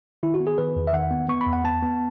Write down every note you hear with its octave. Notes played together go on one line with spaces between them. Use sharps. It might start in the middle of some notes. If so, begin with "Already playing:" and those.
D#3 E4
F#4
B3
G#4
D#3 B4
E2
E5
D#3 F#5
B3
B3 C#6
B5
E2
F#5
B3 A5
B3